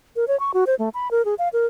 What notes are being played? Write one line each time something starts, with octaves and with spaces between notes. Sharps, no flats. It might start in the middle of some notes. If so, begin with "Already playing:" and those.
A#4
C#5
C#6
F#4
C5
A3
B5
A#4
G#4
F5
A#4